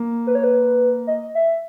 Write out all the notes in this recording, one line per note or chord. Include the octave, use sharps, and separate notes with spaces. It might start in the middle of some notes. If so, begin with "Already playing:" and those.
Already playing: A#3
B4
C#5
B4
D#5
E5